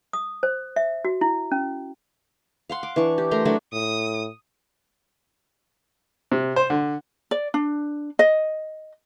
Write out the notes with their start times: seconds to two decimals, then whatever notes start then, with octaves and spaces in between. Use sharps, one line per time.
0.13 D#6
0.43 C5
0.76 E5
1.05 F#4
1.21 E4
1.52 C#4
2.69 F5 F#5 C6
2.83 D6
2.96 E3 D4 C#6
3.18 G4
3.31 A3 A#4 A#5 C6
3.45 F#3 A3 D4 F#4
3.73 A2 D#6
6.32 C3
6.56 C5
6.70 D3
7.31 D5
7.54 D4
8.19 D#5